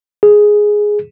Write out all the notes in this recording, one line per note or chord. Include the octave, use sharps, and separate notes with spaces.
G#4